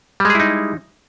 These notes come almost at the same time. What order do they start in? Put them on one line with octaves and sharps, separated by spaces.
G3 G#3 G#4 E4 D#4